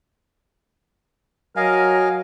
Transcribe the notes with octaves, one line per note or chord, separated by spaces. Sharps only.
F#3 A#4 D#5 F5 G#5